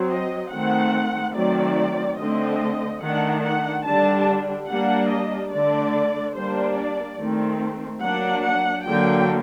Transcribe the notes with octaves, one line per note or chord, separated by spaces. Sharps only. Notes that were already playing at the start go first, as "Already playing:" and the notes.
Already playing: F#3 C4
D#5
D#3 A3 C4 F#5
D#3 F#3 A3 C4 D5
D3 A3 C4 D#5
D#3 A3 D4 F#5
F#5
D3 G3 D4 A5
G3 A#3 D4 F#5
D#5
D3 A3 D4 D5
G3 A#3 D4 C5
D5
D#3 A3 C4
F#3 A#3 D4 F#5
F#5
D3 F#3 A#3 G5